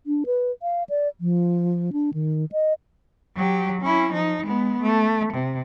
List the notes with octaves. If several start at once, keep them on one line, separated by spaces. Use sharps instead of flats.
D4
B4
F5
D5
F3
D4
D#3
D#5
F#3 G4
C#4 E4
F3 D#4
G#3 B3
A3
C3